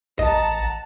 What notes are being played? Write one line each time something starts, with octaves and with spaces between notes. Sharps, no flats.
A1 D#5 F#5 A5 A#5